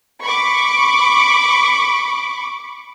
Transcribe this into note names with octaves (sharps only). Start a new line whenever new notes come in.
B5 C#6 D6